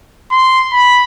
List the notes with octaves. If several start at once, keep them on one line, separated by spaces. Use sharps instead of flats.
C6
B5